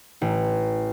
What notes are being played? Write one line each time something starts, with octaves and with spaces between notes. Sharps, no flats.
A1